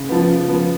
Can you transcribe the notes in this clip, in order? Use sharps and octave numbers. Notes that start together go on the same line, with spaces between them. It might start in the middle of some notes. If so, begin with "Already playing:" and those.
Already playing: C#3
F3 B3
C#3
F3 B3